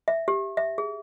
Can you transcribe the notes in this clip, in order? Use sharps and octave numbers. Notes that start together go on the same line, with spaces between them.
E5
G4
E5
G#4